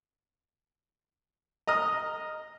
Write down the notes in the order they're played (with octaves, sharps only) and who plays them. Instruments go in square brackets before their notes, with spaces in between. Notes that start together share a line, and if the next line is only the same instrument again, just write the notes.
[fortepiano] D#5 A#5 D#6 F6